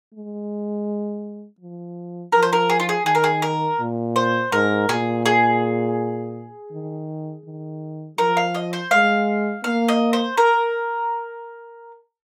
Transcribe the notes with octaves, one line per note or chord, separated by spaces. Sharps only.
G#3
F3
F3 A#4
C5
A#4
G#4
F4
G#4
D#3 G#4
A#4
G#4
A#4
A#2
C5
G#2 A#4
A#2 G#4
G#4
D#3
D#3
F3 A#4
F5
D#5
C5
G#3 F5
A#3 F5
D#5
C5
A#4